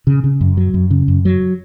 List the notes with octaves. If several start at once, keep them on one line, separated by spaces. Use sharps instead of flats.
C#3
C#3
F#2
F#3
F#2
C#3
F#2
F#3